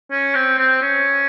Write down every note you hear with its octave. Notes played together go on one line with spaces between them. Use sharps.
C#4
C4
C4
C#4